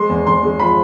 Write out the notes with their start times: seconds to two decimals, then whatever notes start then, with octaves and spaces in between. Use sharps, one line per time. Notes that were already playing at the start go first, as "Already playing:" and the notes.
Already playing: G#3 C6
0.09 E2
0.27 E2 C6
0.43 G#3
0.60 F3 B5